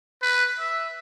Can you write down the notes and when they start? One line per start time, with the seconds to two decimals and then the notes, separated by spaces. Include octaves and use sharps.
0.22 B4
0.59 E5